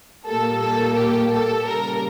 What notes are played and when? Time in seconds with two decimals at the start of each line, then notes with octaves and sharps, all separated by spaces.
0.25 A#2 G3 A#3 A4
0.60 A4
0.95 G4
1.30 A4
1.66 C#3 G3 A#3 A#4